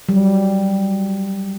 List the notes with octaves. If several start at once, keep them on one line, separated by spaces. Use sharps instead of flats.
F#3 G3